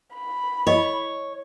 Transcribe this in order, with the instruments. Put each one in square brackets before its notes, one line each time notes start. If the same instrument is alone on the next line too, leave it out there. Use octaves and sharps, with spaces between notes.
[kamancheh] B5
[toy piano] E4 D#5 [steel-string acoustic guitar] C#5